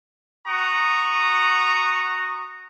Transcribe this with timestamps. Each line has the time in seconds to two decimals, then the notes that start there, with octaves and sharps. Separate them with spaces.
0.47 F#4 F#5 A#5 C#6 D#6